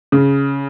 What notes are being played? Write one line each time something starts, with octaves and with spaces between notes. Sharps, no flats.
C#3